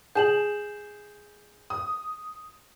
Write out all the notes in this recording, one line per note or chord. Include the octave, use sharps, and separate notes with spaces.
G#4 G6 E7 F#7
D#6